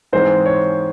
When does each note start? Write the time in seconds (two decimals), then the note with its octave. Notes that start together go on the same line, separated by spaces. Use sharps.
0.12 G#2 E3 G#3 C4 C5
0.46 C#5